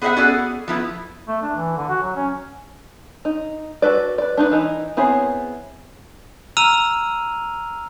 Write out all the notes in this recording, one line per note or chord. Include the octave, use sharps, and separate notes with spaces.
B3 G#4 C5 D#5 E5 F#5
B3 C#4 F#4 G#4 A4 D5
F3 B3 E4
A3
D4
E3
D3
F#4
F#3
C#4
D#4
F#4 A4 B4 D5
B4 D5
D4 D#4 B4
E3 D#4
B3 C4 E4 G#4 C#5
A#5 E6 F6 D#7 F7